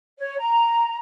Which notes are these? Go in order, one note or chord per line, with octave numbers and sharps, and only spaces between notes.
C#5
A#5